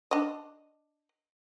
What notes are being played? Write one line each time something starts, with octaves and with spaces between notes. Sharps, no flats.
D4 D#5